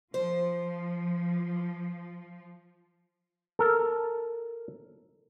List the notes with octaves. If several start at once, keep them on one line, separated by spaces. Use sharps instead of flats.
F3 C5
A4 A#4